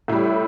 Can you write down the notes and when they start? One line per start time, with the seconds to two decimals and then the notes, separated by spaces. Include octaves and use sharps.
0.08 A2 G3 E4